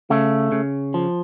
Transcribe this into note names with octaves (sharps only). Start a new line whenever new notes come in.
C#3 A3
C#3
F3